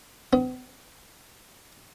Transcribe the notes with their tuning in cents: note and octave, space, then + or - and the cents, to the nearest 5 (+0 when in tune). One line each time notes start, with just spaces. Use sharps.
B3 +45